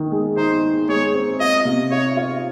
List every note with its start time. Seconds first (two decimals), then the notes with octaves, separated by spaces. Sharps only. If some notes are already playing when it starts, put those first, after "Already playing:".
Already playing: D#3
0.12 G#3
0.37 D#4 C5
0.63 D#4
0.88 G#3 C#5
1.14 C4
1.40 F4 D#5
1.65 C3
1.91 F4 C#5
2.17 F4